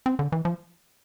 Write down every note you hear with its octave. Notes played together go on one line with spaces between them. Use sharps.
C4
D3
E3
F3